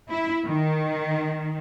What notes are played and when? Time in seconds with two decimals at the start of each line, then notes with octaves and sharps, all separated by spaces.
0.10 E4
0.46 D#3